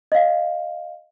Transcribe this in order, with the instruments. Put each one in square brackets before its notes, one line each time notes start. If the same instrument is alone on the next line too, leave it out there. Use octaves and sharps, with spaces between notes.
[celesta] D#5 F5